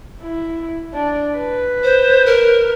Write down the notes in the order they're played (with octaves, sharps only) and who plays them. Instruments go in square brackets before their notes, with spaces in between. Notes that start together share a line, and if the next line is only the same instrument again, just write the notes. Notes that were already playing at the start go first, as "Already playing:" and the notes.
[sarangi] E4
D4
B4
[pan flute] C5
A#4